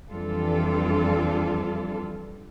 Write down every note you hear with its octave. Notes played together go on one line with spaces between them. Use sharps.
F2 E3 G3 D4 F4 A4